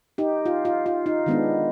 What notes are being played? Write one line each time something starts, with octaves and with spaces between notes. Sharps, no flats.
D#4 G4
F4
F4
F4
D#4
D#3 G#3 B3 D4